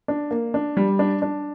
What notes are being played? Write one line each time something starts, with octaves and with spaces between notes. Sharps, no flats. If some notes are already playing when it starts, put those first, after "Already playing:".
D4
A#3
D4
G3
D4
D4